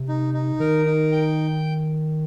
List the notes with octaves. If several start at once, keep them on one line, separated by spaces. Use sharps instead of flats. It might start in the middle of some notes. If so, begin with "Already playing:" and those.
Already playing: C3
D#4
D#4
D#3 A#4
D#4
G5